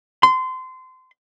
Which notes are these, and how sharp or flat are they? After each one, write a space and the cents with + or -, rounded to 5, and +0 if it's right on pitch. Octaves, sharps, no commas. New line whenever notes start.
C6 -25